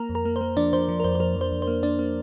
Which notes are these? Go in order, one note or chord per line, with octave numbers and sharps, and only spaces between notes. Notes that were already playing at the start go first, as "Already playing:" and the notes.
Already playing: A#3 A#4 A#5
F2
A#4 A#5
A#3
C5
A#3
F3 D4 D5
F3 C5
F3
A#4
F2 C5
C5
F2 A#4
F2
C5
F2
C5
A#3
A#3 D4 D5
A#3